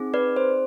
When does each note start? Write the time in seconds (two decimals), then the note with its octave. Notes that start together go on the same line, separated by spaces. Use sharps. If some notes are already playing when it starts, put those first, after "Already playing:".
Already playing: C4 D#4 G#4
0.14 B4 D5
0.36 C5